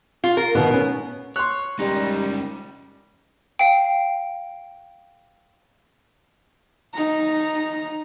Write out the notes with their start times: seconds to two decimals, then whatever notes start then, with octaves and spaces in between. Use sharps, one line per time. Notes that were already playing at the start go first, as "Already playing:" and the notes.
0.24 F4
0.37 A#4
0.55 B2 D#3 B3
0.73 C#4
1.36 C#5 C6 F#6
1.79 G3 G#3 C#4 D#4 A#4
3.59 F5 G5
6.94 D#4 A#5